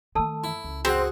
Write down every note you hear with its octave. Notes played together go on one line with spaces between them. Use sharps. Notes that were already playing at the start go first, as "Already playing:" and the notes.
D#3 A3 A4 A5 E6
E4
C#2
C4 F#4 G#4 C5 F#5